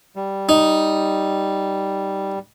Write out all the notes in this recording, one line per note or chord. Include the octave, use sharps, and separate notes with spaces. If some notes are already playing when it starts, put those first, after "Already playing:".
G3
D#4